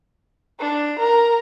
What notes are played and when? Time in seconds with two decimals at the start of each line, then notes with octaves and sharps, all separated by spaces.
0.60 D4
0.99 A#4